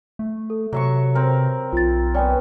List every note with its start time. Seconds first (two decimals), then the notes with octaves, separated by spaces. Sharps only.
0.19 A3
0.50 A4
0.73 C3 F#3 E5 C#6
1.15 C4 A#4
1.73 B1 F4 A6
2.14 B3 C#4 C#5 D5 G5